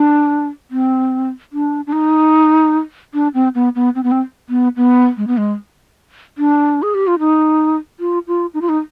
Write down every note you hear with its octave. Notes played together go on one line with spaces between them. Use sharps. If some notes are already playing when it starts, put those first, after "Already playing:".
Already playing: D4
C4
D4
D4
D#4
D4
C4
B3
B3
C4
B3
C4
B3
B3
G#3
B3
G#3
D4
G#4
G4
F4
D#4
F4
F4
D#4
F4
D#4